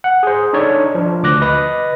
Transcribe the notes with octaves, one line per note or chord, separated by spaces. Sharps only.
F#5
G#4 C5
D4 D#4 A4 C#5 D5
F3 D4
D2 D6 F#6 A#6
B4 D#5 A#6